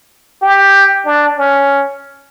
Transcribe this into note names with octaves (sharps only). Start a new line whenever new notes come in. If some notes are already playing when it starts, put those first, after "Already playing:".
G4
D4
C#4